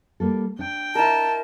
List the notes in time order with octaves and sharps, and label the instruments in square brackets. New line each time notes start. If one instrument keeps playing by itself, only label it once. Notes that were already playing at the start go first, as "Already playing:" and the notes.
[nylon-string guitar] G3 A#3 A4
[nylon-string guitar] D4 [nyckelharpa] G5
[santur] E4 A#4 [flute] A5